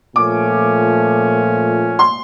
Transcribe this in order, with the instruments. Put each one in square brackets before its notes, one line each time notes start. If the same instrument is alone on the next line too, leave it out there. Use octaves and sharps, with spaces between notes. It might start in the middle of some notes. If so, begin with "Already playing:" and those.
[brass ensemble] A#2 F3 A3 C#4 [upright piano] D6
[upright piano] C6